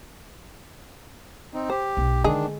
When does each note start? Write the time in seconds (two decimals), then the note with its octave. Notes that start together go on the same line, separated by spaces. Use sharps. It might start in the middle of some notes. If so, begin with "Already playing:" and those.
1.54 C4 D#4
1.70 G4 C5
1.97 B1
2.24 D3 D#3 G#3 D4 G#4